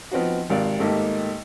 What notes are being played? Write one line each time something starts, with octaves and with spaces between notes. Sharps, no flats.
F3 B3 C4 D#4 F#4
G#1 C3 A#4 D5 F5
G#1 A3 A#3 D#4 G4